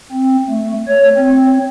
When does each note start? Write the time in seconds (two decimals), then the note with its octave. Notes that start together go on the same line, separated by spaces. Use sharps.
0.12 C4
0.49 A3
0.87 C#5
1.16 C4